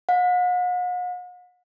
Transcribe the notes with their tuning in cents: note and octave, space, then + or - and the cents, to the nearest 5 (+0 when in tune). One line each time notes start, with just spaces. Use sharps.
F#5 -45